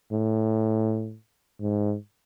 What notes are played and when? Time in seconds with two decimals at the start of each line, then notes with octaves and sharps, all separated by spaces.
0.12 A2
1.61 G#2